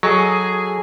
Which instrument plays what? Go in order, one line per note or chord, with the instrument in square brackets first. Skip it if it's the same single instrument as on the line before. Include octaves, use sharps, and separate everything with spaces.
[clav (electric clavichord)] F#3 [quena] G#4 [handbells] A4 D#5 G#5